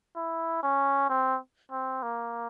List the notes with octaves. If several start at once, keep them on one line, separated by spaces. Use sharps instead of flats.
E4
C#4
C4
C4
A#3